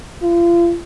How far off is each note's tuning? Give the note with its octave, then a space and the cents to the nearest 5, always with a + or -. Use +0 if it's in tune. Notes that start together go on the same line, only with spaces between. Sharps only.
F4 -35